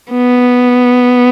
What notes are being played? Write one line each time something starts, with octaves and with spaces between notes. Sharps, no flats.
B3